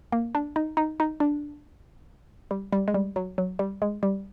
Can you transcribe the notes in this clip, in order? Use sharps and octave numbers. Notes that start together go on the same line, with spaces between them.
A#3
D4
D#4
D#4
D#4
D4
G3
G3
G#3
G3
F#3
F#3
G3
G#3
G3